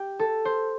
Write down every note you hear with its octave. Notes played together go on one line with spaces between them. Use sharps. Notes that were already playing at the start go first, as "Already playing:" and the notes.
Already playing: G4
A4
C5